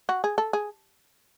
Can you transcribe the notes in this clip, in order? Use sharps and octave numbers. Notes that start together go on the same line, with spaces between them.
F#4
G#4
A4
G#4